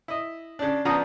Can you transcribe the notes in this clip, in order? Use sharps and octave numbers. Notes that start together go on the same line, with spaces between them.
E4 D#5
C#3 D4
C#3 F3 B3 D4 A#5 D#6